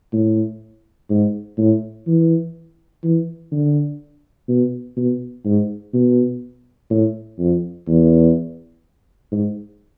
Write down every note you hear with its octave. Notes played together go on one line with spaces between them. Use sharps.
A2
G#2
A2
E3
E3
D3
B2
B2
G#2
B2
A2
F2
E2
G#2